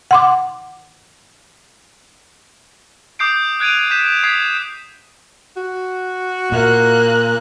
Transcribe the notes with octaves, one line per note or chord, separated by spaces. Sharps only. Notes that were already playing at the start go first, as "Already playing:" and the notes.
F#5 C6 D6
D6 D#6 G6 C7 D7
F#6 G#6 D7 D#7 F7
G6 B6 E7
D#6 G#6 B6 C7
F#4
A#2 A#3 F#6